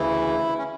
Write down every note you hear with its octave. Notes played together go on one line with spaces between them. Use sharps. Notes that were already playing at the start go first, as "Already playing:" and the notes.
Already playing: D2 C#3 E3 E4
C#4